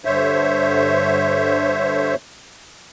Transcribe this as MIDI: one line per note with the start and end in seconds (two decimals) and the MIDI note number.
0.05 2.15 43
0.05 2.15 50
0.05 2.15 72
0.05 2.15 73
0.05 2.15 76